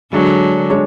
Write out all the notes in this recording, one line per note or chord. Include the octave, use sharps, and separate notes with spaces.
D3 F#3 G#3 D4 G#4 C#5
G#3 D4 G#4 C#5